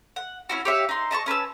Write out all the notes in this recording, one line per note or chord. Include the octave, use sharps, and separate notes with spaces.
F#5
C#4 E4 F#4
G4 C#5 E5 F5
D#4 C6
D#5 A5 B5 C#6
C#4 B4 A5 E6